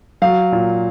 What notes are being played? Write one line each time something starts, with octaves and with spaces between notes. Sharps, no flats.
F#3 F5
A#2